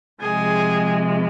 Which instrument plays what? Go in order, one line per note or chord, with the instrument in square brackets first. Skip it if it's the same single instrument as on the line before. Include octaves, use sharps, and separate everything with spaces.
[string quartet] C3 F3 G#3 G#4